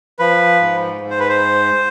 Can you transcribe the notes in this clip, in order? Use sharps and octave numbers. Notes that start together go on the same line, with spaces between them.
F3 B4
G#2
G#2
C5
B4
C5